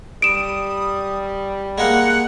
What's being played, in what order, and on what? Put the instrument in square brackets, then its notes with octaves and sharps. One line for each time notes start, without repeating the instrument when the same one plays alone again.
[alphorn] G3 [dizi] D#6 [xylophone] D7 E7
[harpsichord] G#3 A#3 [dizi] F#5